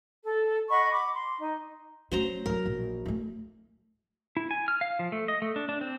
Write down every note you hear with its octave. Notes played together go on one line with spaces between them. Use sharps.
A4
D#5 F#5 B5 C#6
B5 D6
C6
D#4
F#3 A3 C#4 C5 A#5
F#3 E4 A#4
A#1
A3 C#4
E4
G#5
F6
F5
F3
A3
D#5
A3
D4
D4
C4